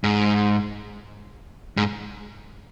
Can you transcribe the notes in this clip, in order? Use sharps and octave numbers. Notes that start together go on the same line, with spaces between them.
G#2
G#2